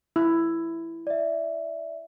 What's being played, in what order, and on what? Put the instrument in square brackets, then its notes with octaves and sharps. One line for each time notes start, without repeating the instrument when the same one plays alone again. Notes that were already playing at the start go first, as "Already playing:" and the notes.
[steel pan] E4
[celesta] D5 E5